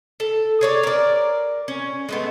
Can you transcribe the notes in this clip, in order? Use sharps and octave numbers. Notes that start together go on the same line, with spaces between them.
A4
G#4 C#5 D5
A#4 D5
C#4
G#3 A3 B3